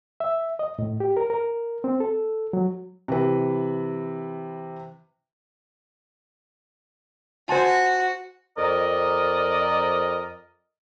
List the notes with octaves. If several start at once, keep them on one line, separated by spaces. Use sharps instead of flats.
E5
D#5
A2
G4
A#4
A#4
C4
A4
F#3
C3 E3 B4
F#4 C5 G#5 A5
F2 A#4 D5 D#5